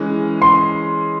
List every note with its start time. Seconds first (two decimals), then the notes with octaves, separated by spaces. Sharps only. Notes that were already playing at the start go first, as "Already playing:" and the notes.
Already playing: E3 G#3 C#4
0.42 C6